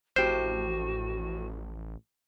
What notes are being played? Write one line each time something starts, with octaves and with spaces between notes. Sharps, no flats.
A1 F2 A2 F#4 G4 C5